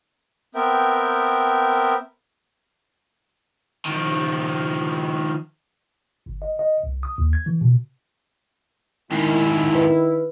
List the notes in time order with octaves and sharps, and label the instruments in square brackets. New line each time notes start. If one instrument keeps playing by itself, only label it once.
[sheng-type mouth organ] B3 C4 A#4 E5 G5
[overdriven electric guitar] D#3 F3
[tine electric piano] G1
D#5
D#5
C2
D#6
D#2
G#6
E3
B2
[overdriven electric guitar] F2 G#2 [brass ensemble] D#3 E4
[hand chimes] B4